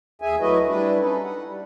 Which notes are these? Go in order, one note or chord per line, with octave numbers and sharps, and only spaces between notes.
D#2 G#4 E5 G#5
F#3 A3 E4 F#4 B4 D#5
G3 D4 E4 B4
C#4 D#4 A4 B4
F#5
G3